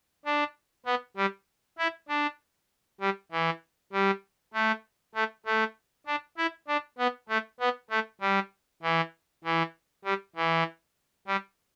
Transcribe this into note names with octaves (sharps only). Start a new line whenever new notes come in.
D4
B3
G3
E4
D4
G3
E3
G3
A3
A3
A3
D4
E4
D4
B3
A3
B3
A3
G3
E3
E3
G3
E3
G3